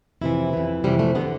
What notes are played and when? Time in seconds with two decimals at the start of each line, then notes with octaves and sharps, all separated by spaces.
0.21 F2 C3 E3 E4
0.53 F2 E3
0.84 F2 C3 E3 G3
0.99 A3
1.15 D3 B3